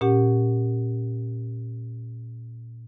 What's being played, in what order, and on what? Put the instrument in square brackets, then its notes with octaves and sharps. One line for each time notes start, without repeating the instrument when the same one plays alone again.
[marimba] A#2 C#4 G4 F#5